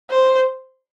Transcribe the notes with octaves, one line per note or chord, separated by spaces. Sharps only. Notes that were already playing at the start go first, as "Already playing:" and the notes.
C5